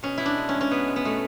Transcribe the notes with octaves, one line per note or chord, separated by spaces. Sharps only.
B2 C#4
B2 E4
D4
G#3
C#4
G#3
C#4
B2 B3
G#3
B3
B2 A3